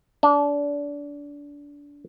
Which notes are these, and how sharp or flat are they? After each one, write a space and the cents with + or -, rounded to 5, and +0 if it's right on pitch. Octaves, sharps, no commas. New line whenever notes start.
D4 -25